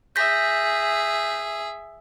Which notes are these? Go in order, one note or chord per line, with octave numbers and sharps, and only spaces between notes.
G#4 E5 G6 A#6 B6